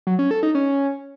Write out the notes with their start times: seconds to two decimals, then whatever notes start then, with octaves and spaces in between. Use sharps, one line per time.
0.07 F#3
0.19 C#4
0.31 A4
0.43 D#4
0.55 C#4